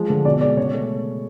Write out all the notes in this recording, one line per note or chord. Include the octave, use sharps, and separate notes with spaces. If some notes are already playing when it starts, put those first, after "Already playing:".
Already playing: F3 G#3
D3
B2 D5
G#3 D5
C#3 C#5
A3